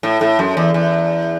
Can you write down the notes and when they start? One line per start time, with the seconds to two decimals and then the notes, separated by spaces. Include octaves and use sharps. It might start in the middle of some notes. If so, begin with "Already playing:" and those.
0.03 A2
0.21 A2
0.39 F#2
0.57 E2
0.74 E2